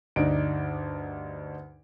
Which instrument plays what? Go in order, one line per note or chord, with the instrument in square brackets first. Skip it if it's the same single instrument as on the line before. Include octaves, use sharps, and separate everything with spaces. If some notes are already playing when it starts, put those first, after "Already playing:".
[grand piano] D2 G2 D4 D#4 D7